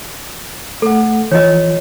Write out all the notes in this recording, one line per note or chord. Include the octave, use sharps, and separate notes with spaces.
A3 A4 F#5
E3 F3 F4 C#5 D#5